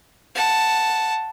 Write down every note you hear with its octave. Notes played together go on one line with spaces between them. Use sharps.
F#5 A5